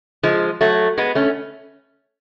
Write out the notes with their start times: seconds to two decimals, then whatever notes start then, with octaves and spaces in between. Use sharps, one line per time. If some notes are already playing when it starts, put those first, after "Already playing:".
0.23 F3 G#3
0.61 F#3 A3
0.98 G#3 B3
1.15 A3 C#4